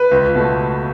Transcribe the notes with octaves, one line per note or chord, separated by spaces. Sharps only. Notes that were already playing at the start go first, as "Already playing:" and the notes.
Already playing: B4
C#2
B2 A3